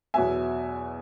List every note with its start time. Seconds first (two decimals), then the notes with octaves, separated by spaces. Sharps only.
0.14 E2 B2 F#3 B3 E5 G#5